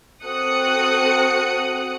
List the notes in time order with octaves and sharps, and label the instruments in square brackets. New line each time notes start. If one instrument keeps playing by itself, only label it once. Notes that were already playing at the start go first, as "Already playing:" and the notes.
[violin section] C4 F#4 A4 D#6 F#6 C#7